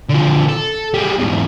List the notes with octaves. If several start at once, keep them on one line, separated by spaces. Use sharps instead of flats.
D3 F3
A4
G3 G#3
E2 G#2